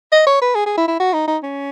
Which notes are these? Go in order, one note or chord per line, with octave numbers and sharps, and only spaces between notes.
D#5
C#5
B4
G#4
G#4
E4
E4
F#4
D#4
D#4
C#4